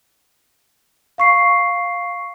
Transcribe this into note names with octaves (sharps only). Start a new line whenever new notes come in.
F5 C#6 C7